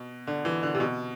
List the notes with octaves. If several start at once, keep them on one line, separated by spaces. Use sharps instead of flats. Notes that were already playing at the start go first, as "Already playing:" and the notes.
Already playing: B2
D3
E3
D3
C3
B2